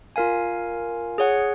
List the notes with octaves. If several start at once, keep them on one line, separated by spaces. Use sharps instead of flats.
F4 A#4 F5 G#5
G#4 C#5 F#5